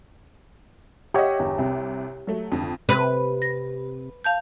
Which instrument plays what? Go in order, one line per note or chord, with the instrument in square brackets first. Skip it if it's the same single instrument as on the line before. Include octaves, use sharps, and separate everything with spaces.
[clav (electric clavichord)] G4 C#5 [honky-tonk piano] D#5 E5 F#5
[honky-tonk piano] G1 E2
C2 C3
F#3 A3
F2 D3
[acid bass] C3 [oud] B4
[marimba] A#6
F5 A5 G6